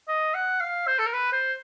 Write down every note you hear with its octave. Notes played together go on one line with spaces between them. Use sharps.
D#5
F#5
F5
C5
A4
A#4
B4
C5